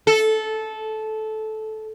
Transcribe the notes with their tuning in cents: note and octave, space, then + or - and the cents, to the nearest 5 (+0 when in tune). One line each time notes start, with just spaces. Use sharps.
A4 -15